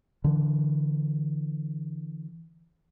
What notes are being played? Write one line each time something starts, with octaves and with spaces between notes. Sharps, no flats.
D3 E3